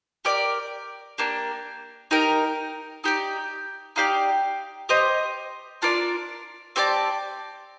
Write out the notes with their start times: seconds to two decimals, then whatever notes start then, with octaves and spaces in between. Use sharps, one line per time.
0.25 G4 A#4 D5
1.18 A#3 D4 G4
2.11 D#4 G4 A#4
3.04 D#4 G4 D5
3.96 D#4 G4 D5 F5
4.89 G4 C5 D#5
5.82 D4 F4 A#4 D5
6.76 C4 G4 D5 A5